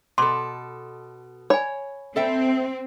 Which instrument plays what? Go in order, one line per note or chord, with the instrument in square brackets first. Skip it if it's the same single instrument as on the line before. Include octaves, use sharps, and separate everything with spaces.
[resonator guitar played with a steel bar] B2 A4 [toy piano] C6 D6
[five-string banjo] C#5 [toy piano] G#5 B5
[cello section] C4 [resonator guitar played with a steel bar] A4 E5 G5